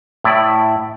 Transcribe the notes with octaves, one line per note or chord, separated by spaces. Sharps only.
A2 E4 D5